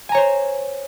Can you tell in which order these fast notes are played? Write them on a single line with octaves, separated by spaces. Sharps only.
G#5 A#5 C#5 C5